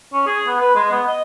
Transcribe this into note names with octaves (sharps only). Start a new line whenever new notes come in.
C#4
G#4
B3
B4
G#3
B3
D#5